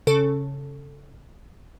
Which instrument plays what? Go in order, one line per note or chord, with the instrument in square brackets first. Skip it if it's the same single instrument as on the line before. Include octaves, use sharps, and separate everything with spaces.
[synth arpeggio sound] C#3 C#4 A4